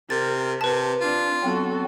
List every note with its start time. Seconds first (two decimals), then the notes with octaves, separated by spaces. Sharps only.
0.10 C3 A#4 A6
0.61 C3 B4 A5
1.00 C4 D4 F4
1.43 F#3 B3 C4 F#4 A4